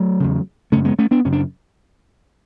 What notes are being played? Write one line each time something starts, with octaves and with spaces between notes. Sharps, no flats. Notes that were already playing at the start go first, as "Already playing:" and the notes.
Already playing: F#3 A3
E2 C#3
F#2 C#3 A3 C#4
G#3 B3
A3 C#4
B3 D4
F#2 C#3 C#4
D4